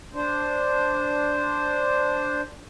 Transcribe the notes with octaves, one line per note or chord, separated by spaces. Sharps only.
D4 C5